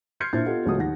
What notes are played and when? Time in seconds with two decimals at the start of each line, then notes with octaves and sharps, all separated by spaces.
0.20 C6 F6 G6 G#6 C7 C#7
0.33 A#2 D4 E4 C5 G6 A6
0.46 B3 F4 G4 A4 D#5 F#5
0.66 C#2 F#3 A3 F#4 D#6
0.78 D#2 F#5 A#6